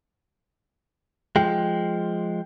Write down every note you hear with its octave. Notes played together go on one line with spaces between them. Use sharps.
F3 G#3 G5